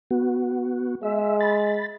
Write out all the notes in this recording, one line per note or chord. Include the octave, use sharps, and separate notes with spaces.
B3 F#4
G#3 E5
B5 A6